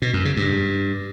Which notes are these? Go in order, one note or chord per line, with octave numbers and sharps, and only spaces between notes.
B2
F#2
C#3
G2